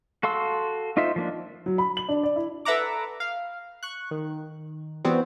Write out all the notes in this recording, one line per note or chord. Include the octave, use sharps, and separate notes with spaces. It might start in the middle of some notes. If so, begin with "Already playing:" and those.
F#4 A4 F5 C6 E6
D#4 F4 C5 E5
F3 A#3 D4
F#3
B5
F#7
D4
D5
E4
A4 B4 E5 F#5 A#5 D6
F5
C#6 F#6
D#3
E3 G3 B3 C4 F#4